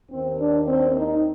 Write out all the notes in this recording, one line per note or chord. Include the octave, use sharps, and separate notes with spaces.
D#2 D#3 C4
D4
C4
D#4